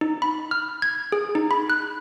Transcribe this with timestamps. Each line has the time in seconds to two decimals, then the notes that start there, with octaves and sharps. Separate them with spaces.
0.01 D#4
0.22 B5
0.51 F6
0.82 G#6
1.12 G#4
1.35 D#4
1.51 B5
1.70 F#6